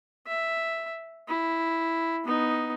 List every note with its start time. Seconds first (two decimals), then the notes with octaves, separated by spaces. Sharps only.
0.27 E5
1.28 E4
2.25 B3 D#4